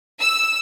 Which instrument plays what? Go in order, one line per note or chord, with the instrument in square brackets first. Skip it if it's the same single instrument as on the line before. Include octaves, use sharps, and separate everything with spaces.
[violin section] E6